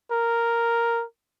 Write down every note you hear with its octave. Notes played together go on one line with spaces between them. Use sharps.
A#4